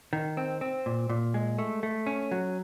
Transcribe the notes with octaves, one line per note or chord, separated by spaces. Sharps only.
D#3
C4
C4
A#2
A#2
G#3
A3
A3
C#4
F#3